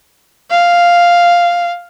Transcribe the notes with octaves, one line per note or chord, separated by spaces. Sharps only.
F5